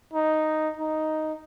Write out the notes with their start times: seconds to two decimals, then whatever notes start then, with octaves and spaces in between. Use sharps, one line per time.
0.14 D#4
0.77 D#4